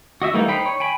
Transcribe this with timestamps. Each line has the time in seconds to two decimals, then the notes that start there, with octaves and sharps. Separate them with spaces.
0.22 F#4 D#5 E5
0.34 E3 G3 A3 A#3 D#4
0.48 D#4 C5 G5 B5
0.66 C#5
0.80 G5 G#5 B5